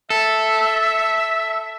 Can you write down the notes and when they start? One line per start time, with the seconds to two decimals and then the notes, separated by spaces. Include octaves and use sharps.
0.10 A4 E5